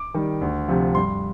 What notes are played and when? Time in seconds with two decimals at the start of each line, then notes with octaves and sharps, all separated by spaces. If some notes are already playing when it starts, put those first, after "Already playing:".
Already playing: D6
0.14 D#3 G3
0.41 D2
0.68 C3 F3
0.95 G2 C6